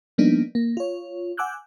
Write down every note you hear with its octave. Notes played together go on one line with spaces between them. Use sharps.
F3 G3 A#3 B3 D4 D#4
A#3
F4 C#5
F#5 G#5 D6 E6 F#6 G6